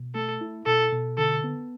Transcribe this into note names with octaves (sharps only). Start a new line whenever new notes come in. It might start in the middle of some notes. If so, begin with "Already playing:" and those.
Already playing: B2
A3 A4
E4
B2 A4
B2
D3 A4
B3